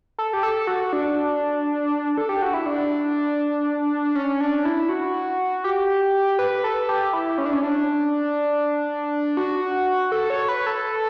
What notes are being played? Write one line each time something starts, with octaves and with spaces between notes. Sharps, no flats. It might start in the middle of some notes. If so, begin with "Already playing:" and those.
A4
G4
A4
F#4
D4
A4
G4
F#4
E4
D4
C#4
D4
E4
F#4
G4
B4
A4
G4
E4
C#4
D4
C#4
D4
F#4
A4
C#5
B4
A4